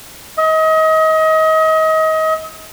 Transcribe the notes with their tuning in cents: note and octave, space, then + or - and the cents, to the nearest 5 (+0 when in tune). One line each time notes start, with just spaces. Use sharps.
D#5 +30